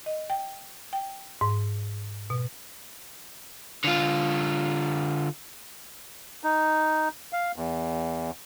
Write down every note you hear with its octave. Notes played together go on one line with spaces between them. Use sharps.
D#5
G5
G5
G#2
B2
D3 F4
D#4
F5
E2